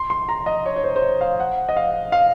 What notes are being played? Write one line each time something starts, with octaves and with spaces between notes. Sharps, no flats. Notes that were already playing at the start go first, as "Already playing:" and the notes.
Already playing: C6
C6
A#5
D#5
C#5
C#5
C5
C5
C#5
F5
F#5
D#5
F5
F5